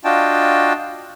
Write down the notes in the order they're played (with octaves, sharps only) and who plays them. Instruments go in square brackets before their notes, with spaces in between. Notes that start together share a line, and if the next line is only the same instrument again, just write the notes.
[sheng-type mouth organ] D4 F4 F#4 D#5 G5 A5